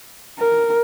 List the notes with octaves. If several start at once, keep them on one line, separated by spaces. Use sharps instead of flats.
A#4